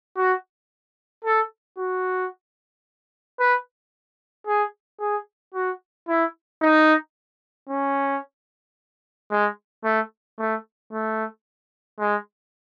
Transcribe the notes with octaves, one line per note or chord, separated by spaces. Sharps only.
F#4
A4
F#4
B4
G#4
G#4
F#4
E4
D#4
C#4
G#3
A3
A3
A3
G#3